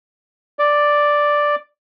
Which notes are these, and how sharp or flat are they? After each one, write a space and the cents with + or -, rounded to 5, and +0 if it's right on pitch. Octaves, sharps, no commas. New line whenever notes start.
D5 +0